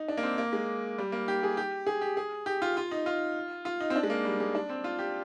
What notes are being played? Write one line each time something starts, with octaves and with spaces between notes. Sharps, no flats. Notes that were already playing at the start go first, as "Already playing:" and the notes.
Already playing: D#4
D4
A#3
C4
A#3
G#3
G3
A#3
G4
G#4
G4
G#4
G4
G#4
G4
F4
F4
D#4
F4
F4
D#4
C4
D4
G#3
A#3
G3
G#3
D4
C4
F4
G4